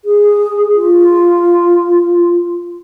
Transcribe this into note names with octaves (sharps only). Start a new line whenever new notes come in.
G#4
F4